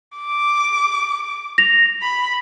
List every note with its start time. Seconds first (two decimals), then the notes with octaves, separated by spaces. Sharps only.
0.18 D6
1.58 A#6 F7
2.02 B5